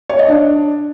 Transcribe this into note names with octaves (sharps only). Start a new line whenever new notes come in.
C#5
D#5
D4